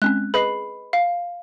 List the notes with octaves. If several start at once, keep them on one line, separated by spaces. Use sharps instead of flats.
G#3 C4 C#4 F#6
G#4 B4 D#5 B5 C7
F5